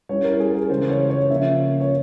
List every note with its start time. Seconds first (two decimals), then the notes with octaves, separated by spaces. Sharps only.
0.09 G3 C#4 E4 C#5
0.24 A#4
0.40 G#4
0.54 A#4
0.70 C#3 E3 G#3 C5
0.89 C#5
1.10 C#5
1.29 C#3 F3 A#3 C#4 E5
1.80 C#5